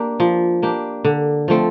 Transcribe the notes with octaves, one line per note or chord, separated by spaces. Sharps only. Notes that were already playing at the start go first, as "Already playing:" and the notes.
Already playing: A#3 D4 G4
F3
A#3 D4 G4
D3
F3 A3 C4